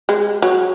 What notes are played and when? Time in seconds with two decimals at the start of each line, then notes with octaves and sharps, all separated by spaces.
0.09 G#3
0.42 F#3